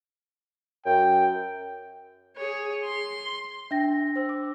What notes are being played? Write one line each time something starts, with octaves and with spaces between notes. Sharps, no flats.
F#2 G5
G#4 C#5
C6
D4 E5 G5 A#6
C5 E6
D6